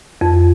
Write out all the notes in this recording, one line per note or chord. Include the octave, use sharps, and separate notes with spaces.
F2